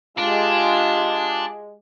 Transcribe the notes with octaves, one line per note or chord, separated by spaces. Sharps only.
G#3 D4 F4 G4